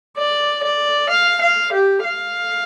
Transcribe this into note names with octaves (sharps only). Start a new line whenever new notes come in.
D5
D5
F5
F5
G4
F5